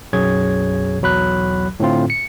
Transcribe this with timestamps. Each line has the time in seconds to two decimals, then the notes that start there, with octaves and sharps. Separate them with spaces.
0.13 B1 F#2 F#3 G#4 C#5 G#6
1.01 B1 E2 F#3 B5 F#6
1.80 A2 D3 C4 F4
2.10 C#7